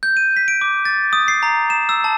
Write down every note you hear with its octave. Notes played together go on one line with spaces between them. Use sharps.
G6
D#7
B6
D7
D6
A6
D#6
C7
A#5
E7
E6
A5